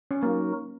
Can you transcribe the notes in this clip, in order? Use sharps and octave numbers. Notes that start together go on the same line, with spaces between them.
C#4
F#3 A#3 D#4 F#4 A#4